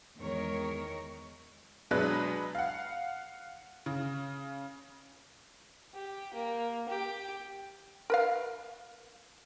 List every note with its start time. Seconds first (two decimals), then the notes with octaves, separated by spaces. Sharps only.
0.19 E2 D#3 G#3 A#4 C#5
1.91 B2 F#3 G#3 D4 B4 F#6
2.55 F5 F#5
3.86 C#3
5.95 G4
6.34 A#3
6.89 G4
8.10 A#4 B4 F5